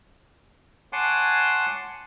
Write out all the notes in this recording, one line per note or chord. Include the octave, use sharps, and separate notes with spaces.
C#5 F#5 G#5 A5 C6 D6